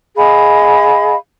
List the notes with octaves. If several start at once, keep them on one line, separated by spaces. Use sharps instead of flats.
G#4 D#5 F5 B5